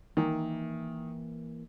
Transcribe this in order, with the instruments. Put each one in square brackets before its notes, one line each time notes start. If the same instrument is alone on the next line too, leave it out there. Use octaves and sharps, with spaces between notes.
[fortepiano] D#3 [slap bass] E3 A#3